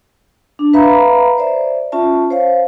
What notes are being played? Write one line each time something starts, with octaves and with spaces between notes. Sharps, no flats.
D4
B4 E5 F5 A#5 B5
C5 D5 E5
C#4 F4 E5 A5
C5 C#5 F5